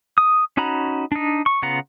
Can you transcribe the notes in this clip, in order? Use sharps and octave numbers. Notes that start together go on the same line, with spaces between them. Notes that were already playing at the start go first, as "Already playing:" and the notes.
D#6
C#4 D#4 F#4 A#5 B5
D4 D#4
C#6
C#3 B3 F4 F#5 A#5